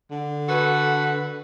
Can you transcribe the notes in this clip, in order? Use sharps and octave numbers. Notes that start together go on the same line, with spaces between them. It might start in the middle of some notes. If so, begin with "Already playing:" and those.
D3
F#4 A4 B4